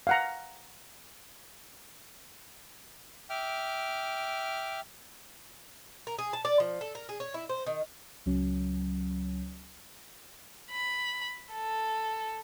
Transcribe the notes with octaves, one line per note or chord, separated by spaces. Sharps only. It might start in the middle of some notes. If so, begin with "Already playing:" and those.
F5 F#5 A#5
E5 G5 D6 F6
A#4
G#4
A5
D5
F3
A4
A#4
G#4
C#5
E4
C5
D#3
C#2 F#3 C#4
B5
A4